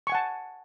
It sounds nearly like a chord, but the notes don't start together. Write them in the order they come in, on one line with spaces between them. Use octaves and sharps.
C#6 G#5 F#5 A5